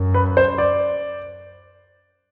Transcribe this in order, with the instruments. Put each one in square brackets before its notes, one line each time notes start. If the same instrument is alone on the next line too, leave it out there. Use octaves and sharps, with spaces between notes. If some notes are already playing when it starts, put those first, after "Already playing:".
Already playing: [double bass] F#2
[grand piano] B4
C5
D5